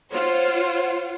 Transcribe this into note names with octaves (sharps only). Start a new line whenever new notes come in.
F4 C5 C#5 F#5